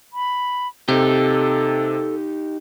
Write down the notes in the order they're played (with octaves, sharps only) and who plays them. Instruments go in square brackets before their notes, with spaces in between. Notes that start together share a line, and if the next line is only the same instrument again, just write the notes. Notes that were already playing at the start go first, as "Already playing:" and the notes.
[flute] B5
[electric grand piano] C3 [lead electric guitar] D#4 G4 [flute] A4